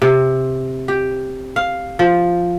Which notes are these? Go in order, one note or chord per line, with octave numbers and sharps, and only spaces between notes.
C3
G4
F5
F3